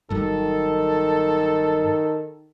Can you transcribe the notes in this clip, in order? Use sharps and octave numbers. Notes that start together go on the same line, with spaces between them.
G1 G2 D#3 F#3 A4